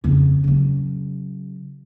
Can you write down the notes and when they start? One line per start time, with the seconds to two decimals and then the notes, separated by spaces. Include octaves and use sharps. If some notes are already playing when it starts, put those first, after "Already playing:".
0.04 F2 C#3
0.44 C#3 F#3